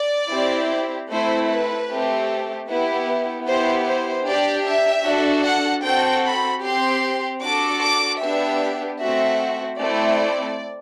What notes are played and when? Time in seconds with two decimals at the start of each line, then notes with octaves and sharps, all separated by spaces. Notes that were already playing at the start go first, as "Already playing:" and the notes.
Already playing: D5
0.31 C4 E4 G4
1.10 A3 C4 E4 C5
1.49 B4
1.90 A3 C4 G4
2.68 B3 E4 G4
3.47 B3 E4 G4 C5
3.86 C5
4.26 D4 G4 D5
4.66 E5
5.06 D4 F#4 A4
5.45 F#5
5.84 C4 F#4 A4 G5
6.24 B5
6.63 C4 G4 C6
7.42 D4 F#4 A4 D6
7.82 D6
8.21 B3 D4 G4 E5
9.00 A3 C4 F#4 E5
9.79 A3 C4 E4 D5